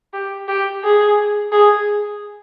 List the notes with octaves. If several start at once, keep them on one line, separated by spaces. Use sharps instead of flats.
G4
G4
G#4
G#4